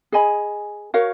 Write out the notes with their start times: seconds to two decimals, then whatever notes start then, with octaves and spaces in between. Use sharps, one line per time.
0.12 G#4 D#5 G#5 B5
0.94 F#4 A#4 C#5 F5